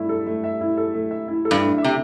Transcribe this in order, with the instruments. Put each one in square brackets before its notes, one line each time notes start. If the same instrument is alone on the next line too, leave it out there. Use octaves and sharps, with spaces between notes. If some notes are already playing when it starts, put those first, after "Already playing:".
Already playing: [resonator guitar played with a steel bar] G2 [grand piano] A3 E4 E5
[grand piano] A4
A3
E5
E4
A4
A3
E5
E4
A4
[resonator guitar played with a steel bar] G2
[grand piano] A3
E5
[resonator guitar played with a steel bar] C3